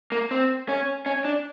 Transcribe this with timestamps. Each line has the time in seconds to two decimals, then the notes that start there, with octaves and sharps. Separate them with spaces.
0.12 A#3
0.31 C4
0.69 C#4
1.06 C#4
1.25 D4